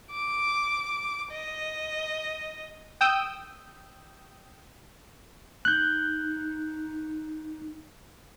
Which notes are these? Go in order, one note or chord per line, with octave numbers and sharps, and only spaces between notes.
D6
D#5
G5 D#6 E6 G6
D#4 F#6 G6